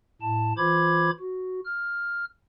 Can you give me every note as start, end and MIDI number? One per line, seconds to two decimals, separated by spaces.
0.22 0.53 45
0.22 0.53 81
0.57 1.11 52
0.57 1.11 65
0.57 1.11 72
0.57 1.11 83
0.57 1.11 86
0.57 1.11 92
1.19 1.60 66
1.65 2.25 89